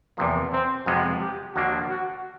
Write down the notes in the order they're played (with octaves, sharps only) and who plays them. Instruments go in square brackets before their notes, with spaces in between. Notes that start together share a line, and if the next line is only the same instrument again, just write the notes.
[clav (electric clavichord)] E2 C3 F3 [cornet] A#3
[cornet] C4
[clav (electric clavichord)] F2 C3 F3 G#3 B3 [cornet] F#4
[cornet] G4
[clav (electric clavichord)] D#2 D3 F3 A#3 D4 [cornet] F#4
[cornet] F#4